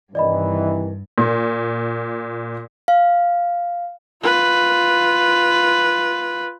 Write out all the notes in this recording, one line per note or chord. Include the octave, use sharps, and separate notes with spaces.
G2 C3 D#3 E3 D5 D#5 B5
A#2
F5
F4 B4